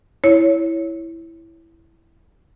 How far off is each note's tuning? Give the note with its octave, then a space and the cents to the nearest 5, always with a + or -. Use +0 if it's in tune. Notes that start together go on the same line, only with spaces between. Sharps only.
E4 +0 C#5 +0